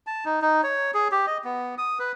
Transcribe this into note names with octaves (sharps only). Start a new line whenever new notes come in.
A5
D#4
D#4
C#5
G#4
G4
D#5
B3
D#6
B4